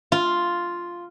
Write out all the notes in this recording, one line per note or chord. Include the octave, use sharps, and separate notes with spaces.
F4